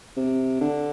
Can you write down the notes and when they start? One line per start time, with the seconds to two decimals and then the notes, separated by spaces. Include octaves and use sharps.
0.17 C3
0.61 D3